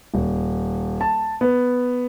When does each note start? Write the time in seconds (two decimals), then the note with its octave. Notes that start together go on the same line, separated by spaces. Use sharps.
0.14 D#1
1.01 A5
1.41 B3